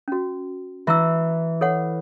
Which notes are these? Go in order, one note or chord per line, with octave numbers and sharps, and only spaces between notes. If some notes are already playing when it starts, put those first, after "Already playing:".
C#4 F#4
E3 E5 A#5 E6
A4 C#5 F#5